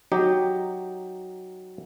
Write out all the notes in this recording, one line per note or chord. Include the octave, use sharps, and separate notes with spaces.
F#3 D#4 G4